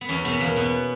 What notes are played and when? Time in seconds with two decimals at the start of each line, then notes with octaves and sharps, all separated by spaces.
0.01 B3
0.09 E2 C#4
0.25 B2 B3
0.40 E2 A#3
0.56 B2 B3